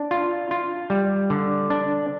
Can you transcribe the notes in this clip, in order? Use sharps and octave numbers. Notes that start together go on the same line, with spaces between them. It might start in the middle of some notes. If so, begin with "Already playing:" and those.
Already playing: D4
F4
F4
G3
D3
D4